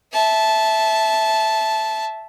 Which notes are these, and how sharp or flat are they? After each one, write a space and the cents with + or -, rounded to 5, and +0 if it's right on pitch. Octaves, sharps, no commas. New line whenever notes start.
E5 +0 A5 -15